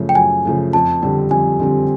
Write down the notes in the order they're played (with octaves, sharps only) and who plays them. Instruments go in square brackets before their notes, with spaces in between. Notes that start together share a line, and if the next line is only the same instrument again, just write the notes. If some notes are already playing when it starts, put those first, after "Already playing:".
Already playing: [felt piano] F#2 C#3 F3 A3
[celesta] G5
[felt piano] F#2 [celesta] G#5
[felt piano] C#3 F3 A3
[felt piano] F2 [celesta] A5
[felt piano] D3 G3 C4
[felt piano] F2 [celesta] G#5
[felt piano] D3 G3 C4